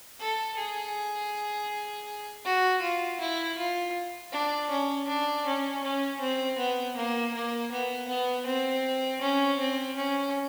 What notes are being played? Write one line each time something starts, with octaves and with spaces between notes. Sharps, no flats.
A4
G#4
F#4
F4
E4
F4
D4
C#4
D4
C#4
C#4
C4
B3
A#3
A#3
B3
B3
C4
C#4
C4
C#4